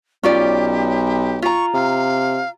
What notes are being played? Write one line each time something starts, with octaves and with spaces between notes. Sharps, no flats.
B1 C#4 F4 G4 D5
F4 A#5 C#6
C3 F5